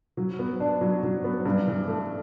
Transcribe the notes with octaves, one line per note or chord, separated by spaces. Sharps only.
F#3
B3
D4
F#3
F#3
B3
G2
E3
A3